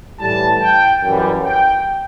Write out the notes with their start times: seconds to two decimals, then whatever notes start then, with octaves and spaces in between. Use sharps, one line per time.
0.19 A2 E3 G3 A5
0.60 G5
1.02 F#2 E3 G3
1.43 G5